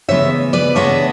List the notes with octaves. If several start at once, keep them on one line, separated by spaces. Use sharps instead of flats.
C#3 E3 G#3 B3 C#5 E5
B4 D5
C#3 E3 G#3 B3 D4 C#5 E5